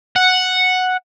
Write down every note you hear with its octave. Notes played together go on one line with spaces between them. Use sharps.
F#5